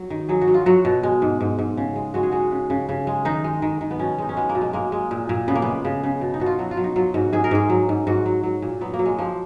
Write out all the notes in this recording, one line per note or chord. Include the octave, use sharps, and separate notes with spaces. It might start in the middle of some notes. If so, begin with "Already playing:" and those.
Already playing: F#3
D#3
F#3 G#4
F#4
F#3
F4
F#3 F#4
B2
G#3
G#2
G#2
G#2
C#3
G#3
G#3 F#4
G#4
G#3 F#4
C#3
C#3
C#3
G#3
D#3 D#4
G#3
D#3
D#3
B3
B2 C#4
G#3 D#4
C#4
G#3 B3
A#3
B2
G#3
G#3 A#3
G#3
A#2
A#2
C#3 B3
A#3
G#3 B3
C#3
C#3
B2
D#4
B2 F#4
F4
F#3 F#4
F4
F#3
D#4
F#3 F4
G#2 F#4
G#2 G#4
A#4
G#2 G#4
F#3
G#2
G#2 F#4
F#3
F#3
A#2
F#3 B3
A#3
F#3
G#3
F3 A#3